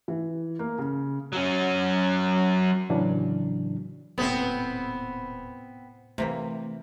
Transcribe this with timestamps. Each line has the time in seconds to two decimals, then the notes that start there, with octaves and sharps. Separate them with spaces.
0.08 E3
0.59 A#3
0.78 C#3
1.32 F#3 C#4
2.89 A2 C#3 E3 F#3 D4
4.18 D#1 A2 C3 B3 C4
6.18 C3 E3 A3 A#3